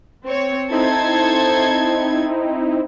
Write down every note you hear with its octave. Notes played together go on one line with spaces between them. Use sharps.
C4 C#5
C4 D#4 E4 A4 C5 G#6